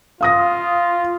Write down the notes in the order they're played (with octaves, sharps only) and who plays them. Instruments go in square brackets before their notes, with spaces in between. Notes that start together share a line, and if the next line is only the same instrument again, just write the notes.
[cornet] F4 [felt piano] F5 D#6 A#6